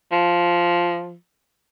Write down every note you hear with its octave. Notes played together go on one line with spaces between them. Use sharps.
F3